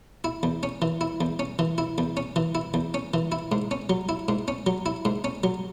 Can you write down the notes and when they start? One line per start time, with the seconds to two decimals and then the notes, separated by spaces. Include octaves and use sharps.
0.24 E4
0.43 E2
0.63 C#4
0.82 E3
1.01 E4
1.21 E2
1.39 C#4
1.59 E3
1.78 E4
1.98 E2
2.17 C#4
2.36 E3
2.55 E4
2.74 E2
2.94 C#4
3.14 E3
3.32 E4
3.52 G#2
3.71 C#4
3.90 F#3
4.09 E4
4.28 G#2
4.48 C#4
4.67 F#3
4.86 E4
5.05 G#2
5.24 C#4
5.44 F#3